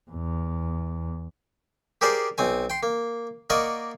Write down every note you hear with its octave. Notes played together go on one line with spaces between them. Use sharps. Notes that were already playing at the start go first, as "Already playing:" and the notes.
E2
G4 G#4 A#4 C5 D5
B1 C4 G#5
G5 C6
A#3
A#3 A#4 D5 D#5 F#5 C#6